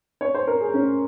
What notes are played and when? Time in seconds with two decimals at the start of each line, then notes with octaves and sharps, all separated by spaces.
0.21 C#5
0.34 C5
0.47 A#4
0.61 G#4
0.74 C#4